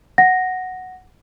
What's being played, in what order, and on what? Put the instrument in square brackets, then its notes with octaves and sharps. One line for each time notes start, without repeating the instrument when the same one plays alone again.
[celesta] F#5 A#6